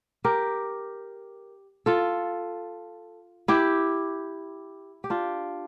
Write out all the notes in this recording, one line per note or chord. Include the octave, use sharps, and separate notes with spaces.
G4 A#4
F4 A4
E4 G4
G4
D4 F4